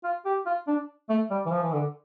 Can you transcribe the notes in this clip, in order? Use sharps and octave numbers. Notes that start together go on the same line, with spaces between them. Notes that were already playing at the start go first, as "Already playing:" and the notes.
F4
G4
F4
D4
A3
G3
E3
F3
E3
D3